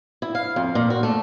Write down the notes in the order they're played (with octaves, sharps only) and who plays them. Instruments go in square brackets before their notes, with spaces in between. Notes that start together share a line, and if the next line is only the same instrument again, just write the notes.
[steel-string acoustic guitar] E4
F5
F2
A#2
F#4
A3